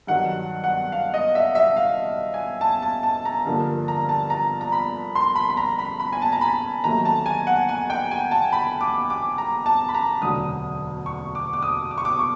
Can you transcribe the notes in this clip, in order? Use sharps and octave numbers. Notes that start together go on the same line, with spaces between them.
G2 D#3 F#3 F#5
F#5
F5
D#5
E5
E5
F5
G#5
A5
A5
A5
A#5
G2 D3 F3 A#3
A#5
A5
A#5
A#5
B5
C6
B5
B5
A#5
B5
B5
G#5
A5
A#5
B5
D#2 D#3 F#3 A3 A#5
A5
G#5
F#5
G#5
G5
G#5
A5
B5
D6
D6
A#5
A5
B5
A#5
E1 D2 D3 F#3 D#6
C#6
D6
D6
D#6
D6
C#6
D6
C#6